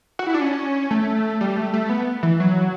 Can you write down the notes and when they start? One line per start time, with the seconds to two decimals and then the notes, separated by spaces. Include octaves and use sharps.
0.19 F#4
0.27 E4
0.34 D4
0.41 C#4
0.91 A3
1.41 G3
1.57 A3
1.74 A3
1.89 B3
2.23 E3
2.40 F#3